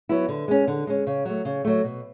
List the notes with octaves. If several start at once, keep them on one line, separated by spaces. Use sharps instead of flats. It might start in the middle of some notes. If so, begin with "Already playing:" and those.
F#3 B3 E4
D3
G#3 C#4
D3
G#3 C#4
C#3
F#3 A3
C#3
F#3 A3
B2